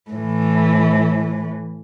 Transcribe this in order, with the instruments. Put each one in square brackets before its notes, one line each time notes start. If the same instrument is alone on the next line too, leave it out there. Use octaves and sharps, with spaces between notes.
[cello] A2 E3